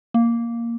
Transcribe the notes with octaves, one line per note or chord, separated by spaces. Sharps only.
A#3